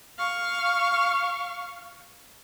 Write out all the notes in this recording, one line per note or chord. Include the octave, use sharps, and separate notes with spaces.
F5 C#6